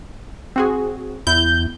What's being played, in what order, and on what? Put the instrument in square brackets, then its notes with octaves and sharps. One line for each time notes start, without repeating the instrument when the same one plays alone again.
[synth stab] C4 F#4 G#4
[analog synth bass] E2 [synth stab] E4 [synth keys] G6